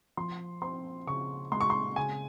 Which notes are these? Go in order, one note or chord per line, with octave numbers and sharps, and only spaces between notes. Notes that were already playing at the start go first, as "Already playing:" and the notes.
F3 C6
C4 C6
C#3 C#6
G#3 C6
C#6
C6
C#3 G#5